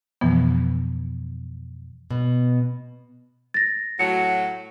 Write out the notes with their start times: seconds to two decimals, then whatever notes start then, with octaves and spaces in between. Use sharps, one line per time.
0.21 F2 B2 E3 F3 B3
2.10 B2
3.54 A6 A#6
3.99 A2 F#3 C#7